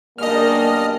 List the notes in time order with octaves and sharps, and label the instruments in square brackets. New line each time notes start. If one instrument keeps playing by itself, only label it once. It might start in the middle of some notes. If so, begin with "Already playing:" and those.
[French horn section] F#2 B2 G3 [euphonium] A#3 [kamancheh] D4 G#4 [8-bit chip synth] D#5 F6